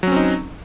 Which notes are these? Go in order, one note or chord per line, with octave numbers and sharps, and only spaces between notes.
F#3 C4 C#4 D#4